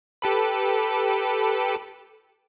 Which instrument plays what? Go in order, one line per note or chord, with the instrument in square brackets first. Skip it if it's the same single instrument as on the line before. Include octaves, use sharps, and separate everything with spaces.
[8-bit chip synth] G4 A4 B4